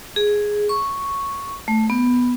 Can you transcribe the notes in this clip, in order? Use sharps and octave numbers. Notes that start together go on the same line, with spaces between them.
G#4
C#6
A3
B3